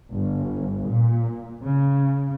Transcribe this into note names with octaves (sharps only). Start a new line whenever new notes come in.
G1
A#2
C#3